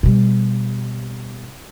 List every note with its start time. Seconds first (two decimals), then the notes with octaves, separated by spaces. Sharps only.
0.03 B2 G3